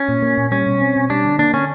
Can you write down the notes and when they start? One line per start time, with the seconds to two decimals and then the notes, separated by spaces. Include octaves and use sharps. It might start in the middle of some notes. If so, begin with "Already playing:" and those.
Already playing: C#4
0.09 A#2
0.22 A#3
0.38 A#2
0.51 G3 C#4
0.67 B2
0.82 C4
0.96 B2
1.10 G3 D4
1.24 D3
1.39 A#3 D4
1.53 D3 C#4